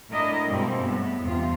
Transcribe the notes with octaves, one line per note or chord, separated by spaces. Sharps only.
A2 D4 E4 A#4 D#5
G2 B2 G3 G#3 A#3 C4
A2 B3
E2 G2 C3 F4